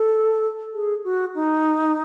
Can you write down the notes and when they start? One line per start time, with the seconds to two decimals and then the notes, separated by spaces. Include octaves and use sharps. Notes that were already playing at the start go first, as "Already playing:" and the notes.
Already playing: A4
0.73 G#4
1.04 F#4
1.34 D#4